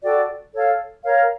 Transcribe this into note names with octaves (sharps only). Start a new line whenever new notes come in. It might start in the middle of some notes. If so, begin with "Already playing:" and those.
F#4 A4 D5 G5
A4 C#5 F5
A#4 C#5 F5